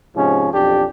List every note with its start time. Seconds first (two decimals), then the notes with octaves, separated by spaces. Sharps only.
0.16 G#2 C3 F3 C#4
0.53 B1 F2 D4 G4